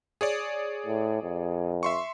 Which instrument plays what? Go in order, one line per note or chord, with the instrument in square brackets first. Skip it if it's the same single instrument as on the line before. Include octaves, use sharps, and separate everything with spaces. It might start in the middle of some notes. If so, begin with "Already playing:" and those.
[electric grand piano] G#4 C#5 D5
[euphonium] A2
F2
[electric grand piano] E5 C6 C#6